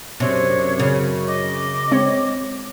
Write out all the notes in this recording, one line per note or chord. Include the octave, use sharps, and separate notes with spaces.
F#2 C3 D4 C#5
C#3
D#5 D6
G#3 C4 C#5